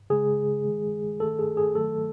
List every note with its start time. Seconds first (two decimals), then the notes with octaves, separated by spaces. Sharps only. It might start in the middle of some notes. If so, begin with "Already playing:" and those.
0.10 C#3 G#3 G#4
0.65 D#3 G#3
1.20 D#3 A3 A4
1.39 G#4
1.57 G#4
1.75 D#3 F#3 A3 A4